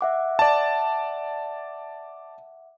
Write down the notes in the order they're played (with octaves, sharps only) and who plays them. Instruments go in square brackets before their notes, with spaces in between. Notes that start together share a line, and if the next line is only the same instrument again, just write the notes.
[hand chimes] E5 F#5 D6
[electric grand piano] D5 A5